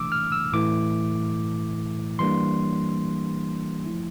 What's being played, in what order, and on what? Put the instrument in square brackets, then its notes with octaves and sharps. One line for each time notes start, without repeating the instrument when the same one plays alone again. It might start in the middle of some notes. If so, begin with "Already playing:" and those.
Already playing: [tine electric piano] C3 E3 A3 D4 D6 E6
F6
E6
A2 E3 A3 E4 D6
E3 G3 A#3 D4 C6
F3 A3 E4